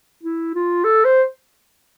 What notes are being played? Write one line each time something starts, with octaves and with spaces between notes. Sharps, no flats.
E4
F4
A4
C5